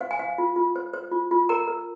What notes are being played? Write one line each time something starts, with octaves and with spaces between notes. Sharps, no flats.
C5 F5
G#5
C5 F5
F4
F4
C5
C5
F4
F4
A#4 A#5
A#4